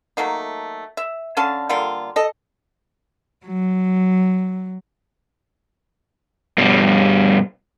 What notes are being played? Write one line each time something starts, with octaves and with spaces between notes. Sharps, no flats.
F#3 A3 A#3 D#4
E5
D3 C#4 F5 A5
D3 G3 A#3 F4
A4 D#5
F#3
G2 B2 G3